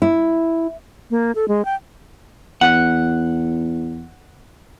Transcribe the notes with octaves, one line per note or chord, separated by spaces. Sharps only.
E4
A#3
A4
G#3
G5
E2 F#5